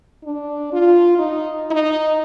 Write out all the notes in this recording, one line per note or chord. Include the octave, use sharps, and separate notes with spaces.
D4
F4
D#4
D#4